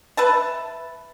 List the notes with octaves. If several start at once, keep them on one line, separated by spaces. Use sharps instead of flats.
B4 E5 A5